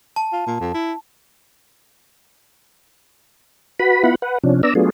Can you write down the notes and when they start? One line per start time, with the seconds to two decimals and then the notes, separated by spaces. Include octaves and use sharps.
0.16 A5
0.32 F4
0.47 A#2
0.60 F2
0.74 E4
3.79 F#4 B4 B5
4.04 B3 E4 F4 F#5 B5
4.22 B4 F#5
4.44 C3 F3 C#4 D4
4.63 B3 D4 D5 A#5 E6
4.75 F#3 A3 B3 D4 F4 G#4